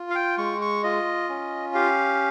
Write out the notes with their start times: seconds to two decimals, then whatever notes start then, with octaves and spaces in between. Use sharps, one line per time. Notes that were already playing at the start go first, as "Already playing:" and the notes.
Already playing: F4
0.10 F5
0.15 G5
0.38 G#3 C#6
0.61 C#6
0.83 F4 D#5
1.29 C#4
1.74 G4 F5